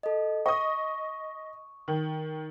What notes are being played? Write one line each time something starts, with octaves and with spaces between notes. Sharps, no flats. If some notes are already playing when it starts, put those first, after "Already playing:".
A4 D#5
D#5 C#6 D#6
D#3